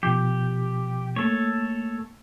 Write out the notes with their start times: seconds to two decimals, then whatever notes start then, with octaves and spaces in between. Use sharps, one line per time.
0.03 B2 F3 G4
1.16 A3 A#3 A4 C#5